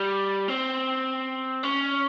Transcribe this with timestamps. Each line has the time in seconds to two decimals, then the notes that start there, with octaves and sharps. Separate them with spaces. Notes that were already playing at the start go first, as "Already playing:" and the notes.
Already playing: G3
0.48 C4
1.63 C#4